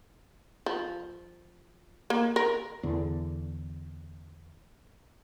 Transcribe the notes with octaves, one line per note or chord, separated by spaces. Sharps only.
F3
A#3
A#4
E2 D3